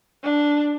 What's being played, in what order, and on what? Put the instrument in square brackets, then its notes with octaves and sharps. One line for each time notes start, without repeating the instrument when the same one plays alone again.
[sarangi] D4